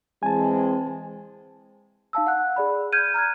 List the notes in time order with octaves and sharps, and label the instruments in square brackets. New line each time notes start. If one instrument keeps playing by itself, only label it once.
[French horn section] E3 G#3 C4 [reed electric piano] G#5 A5
[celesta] D#4 F5 A5 E6
F#5 F#6
G#4 D5 B5
F6 G6 G#6 D#7
A#5 F6 F#6 G#6